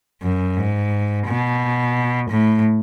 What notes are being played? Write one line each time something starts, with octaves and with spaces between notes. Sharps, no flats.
F#2
G#2
B2
A2